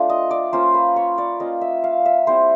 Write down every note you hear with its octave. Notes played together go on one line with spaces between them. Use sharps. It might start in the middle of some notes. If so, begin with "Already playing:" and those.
Already playing: A3 D4 F4
D#5
D5
A#3 C#4 F4 C5
B4
C#5
D5
A#3 C#4 F4 D#5
E5
F5
E5
G3 C4 E4 C5